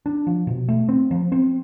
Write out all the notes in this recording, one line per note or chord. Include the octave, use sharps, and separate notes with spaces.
D4
F3
B2
A3
C4
F3
C4